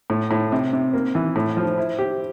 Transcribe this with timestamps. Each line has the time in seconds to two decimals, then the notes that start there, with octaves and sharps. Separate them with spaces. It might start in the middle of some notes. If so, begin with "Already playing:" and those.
0.10 A2
0.31 A2
0.52 C3
0.73 C3
0.94 A#3
1.15 E3
1.36 A2
1.57 F3
1.78 E4
1.99 G4